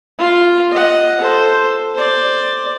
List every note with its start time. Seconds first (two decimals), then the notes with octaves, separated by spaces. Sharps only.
0.18 F4 F5
0.72 D#5 F#5
1.21 A4 C5
1.95 C5 D5